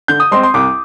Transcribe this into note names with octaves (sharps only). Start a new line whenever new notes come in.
D3 G6
D#6
G#3 C4 C6
C6
C2 D6